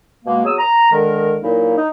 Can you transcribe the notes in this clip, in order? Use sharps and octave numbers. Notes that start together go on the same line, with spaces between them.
B2 G#3 A#3
F#3 B3 G#4 D#6 E6
A#5
D3 D#3 G#3 A#4
A#2 F#3 A#3 D#4 E4
D#4